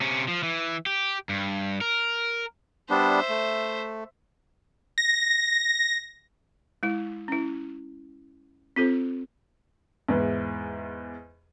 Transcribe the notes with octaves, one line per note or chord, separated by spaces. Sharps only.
C3 C#4
F3
E3
G4
G2
A#4
G3 B3 D4 C5 E5
A3
A#6
G#3 E4
C#4 E4
C4 F4 A4 C5
E2 G#2 E3